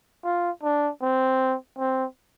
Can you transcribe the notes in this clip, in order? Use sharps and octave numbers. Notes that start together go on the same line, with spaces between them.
F4
D4
C4
C4